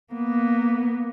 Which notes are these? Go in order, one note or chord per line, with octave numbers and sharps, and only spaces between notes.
A#3 B3